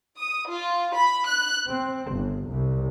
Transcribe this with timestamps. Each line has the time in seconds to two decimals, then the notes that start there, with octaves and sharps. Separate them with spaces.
0.17 D#6
0.51 F4
0.96 B5
1.27 F#6
1.69 C4
2.13 G1
2.49 C2